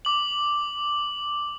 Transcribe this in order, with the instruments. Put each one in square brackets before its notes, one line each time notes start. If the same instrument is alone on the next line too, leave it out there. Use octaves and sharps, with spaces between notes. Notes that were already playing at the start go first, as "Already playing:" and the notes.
[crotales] D6 F#7